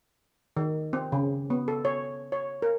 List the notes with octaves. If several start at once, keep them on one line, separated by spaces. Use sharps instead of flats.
D#3
C4
C#3
B3
A4
C#5
C#5
A#4